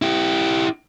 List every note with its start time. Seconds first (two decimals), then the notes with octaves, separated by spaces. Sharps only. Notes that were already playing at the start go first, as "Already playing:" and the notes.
0.02 E4 G4